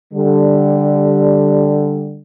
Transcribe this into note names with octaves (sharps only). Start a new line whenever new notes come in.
D3 G3